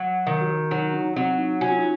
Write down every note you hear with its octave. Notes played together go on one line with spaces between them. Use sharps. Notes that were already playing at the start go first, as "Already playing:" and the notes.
Already playing: F#3
D#3
F#4
F#3 D#4
D#4
F#3 C4
D#4
C#4 F#4
F4
D#4